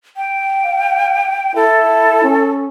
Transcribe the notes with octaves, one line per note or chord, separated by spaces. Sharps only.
G5
F5
E4 A4
C#4